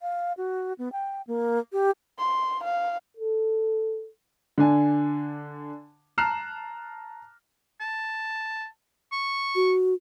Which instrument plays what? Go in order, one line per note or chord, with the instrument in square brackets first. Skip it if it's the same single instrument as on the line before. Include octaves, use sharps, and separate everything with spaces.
[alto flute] F5
F#4
B3
G5
A#3
G4
[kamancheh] C6
F5
[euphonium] A4
[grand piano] D3 D4 G#5
A5 A#5 F6 F#6 C7 E7
[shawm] A5
C#6
[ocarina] F#4